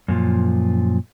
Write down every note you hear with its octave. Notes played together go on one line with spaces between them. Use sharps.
F#2 A#2 F3